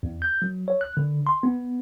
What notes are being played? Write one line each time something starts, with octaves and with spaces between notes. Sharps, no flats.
E2
G6
F#3
C#5
F#6
D3
C6
B3